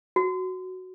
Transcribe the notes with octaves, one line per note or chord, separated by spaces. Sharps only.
F#4